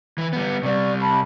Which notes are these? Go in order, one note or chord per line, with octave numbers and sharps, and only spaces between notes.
E3 B4
G3 B3
C3 G3 D5 C#6
A5 B5